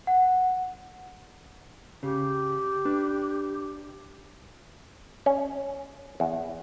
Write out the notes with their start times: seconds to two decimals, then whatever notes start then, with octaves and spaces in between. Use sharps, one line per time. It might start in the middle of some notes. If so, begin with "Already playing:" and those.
0.07 F#5
2.03 C#3 G4
2.85 D4 B4
5.26 C#4
6.20 E2